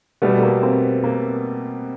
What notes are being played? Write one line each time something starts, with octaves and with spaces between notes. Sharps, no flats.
B2 G3 A3 B3
A3
A#3
A#3 C4
A#3